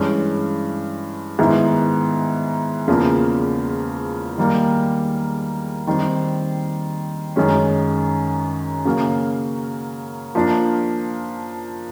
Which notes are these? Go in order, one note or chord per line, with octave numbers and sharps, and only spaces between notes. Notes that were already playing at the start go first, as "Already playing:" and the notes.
Already playing: G2 E3 G#3 C#4
G#2 D#3 G#3 B3 E4
E2 C#3 F3 A#3
D#3 G3 A#3
D#3 G3 C4
F#2 D#3 G#3 C#4
C#3 F#3 A#3
F3 A#3 D4